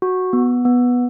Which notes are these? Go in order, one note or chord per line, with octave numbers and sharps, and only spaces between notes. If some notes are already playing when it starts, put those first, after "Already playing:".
F#4
B3
B3